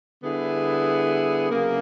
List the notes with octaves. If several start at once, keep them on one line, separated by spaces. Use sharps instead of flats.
D3 G3 B3 E4 G#4
C#3 F#3 A#3